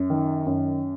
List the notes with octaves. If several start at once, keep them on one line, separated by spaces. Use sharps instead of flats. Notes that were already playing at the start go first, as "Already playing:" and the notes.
Already playing: F#2
D#3
F#2